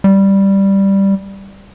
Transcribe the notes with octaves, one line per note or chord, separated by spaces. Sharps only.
G3